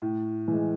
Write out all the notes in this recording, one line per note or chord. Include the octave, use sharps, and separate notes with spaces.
A2
E3 G#3